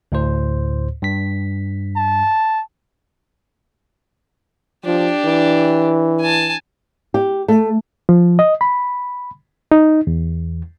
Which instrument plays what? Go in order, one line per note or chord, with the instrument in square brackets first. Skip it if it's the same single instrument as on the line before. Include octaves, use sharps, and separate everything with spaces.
[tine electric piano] D2 A2 C5
G2 B6
[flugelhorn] A5
[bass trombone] F3 [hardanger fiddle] D4 G4
[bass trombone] E3
[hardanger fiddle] G#5 A5
[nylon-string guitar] G4
A3
[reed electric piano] F3
D#5
B5
D#4
E2